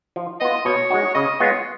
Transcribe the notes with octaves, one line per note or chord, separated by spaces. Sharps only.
F3
B3 F4 D#5
B2 C#5
G#3 D#4 F#4
C#3 D#5
G#3 B3 F4 C#5